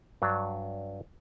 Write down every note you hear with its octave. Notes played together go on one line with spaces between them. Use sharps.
G2 F#3 D4